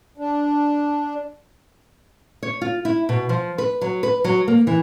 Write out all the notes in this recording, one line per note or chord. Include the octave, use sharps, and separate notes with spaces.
D4
C#5
F4
E4
B2
F3
B4
F#3
B4
F#3
A#3
E3